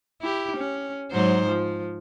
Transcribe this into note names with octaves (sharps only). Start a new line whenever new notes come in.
E4 G4
C#4
G#2 F#3 C5
F3